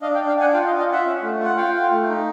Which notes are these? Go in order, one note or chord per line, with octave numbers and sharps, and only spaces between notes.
D4 D#5 F5
F5 G5
D4
F5 G5
D4 F#5 G#5
F4 F5 G5
D#5 F5
F4
D#5 F5
F4 E5 F#5
C#4
A3
F4
F#5
F4 F5 G5
F4
A3
D#4